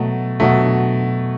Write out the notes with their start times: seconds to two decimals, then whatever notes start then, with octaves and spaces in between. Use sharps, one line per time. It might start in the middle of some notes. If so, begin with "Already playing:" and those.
Already playing: B2 F#3 A3
0.40 B2 F#3 A3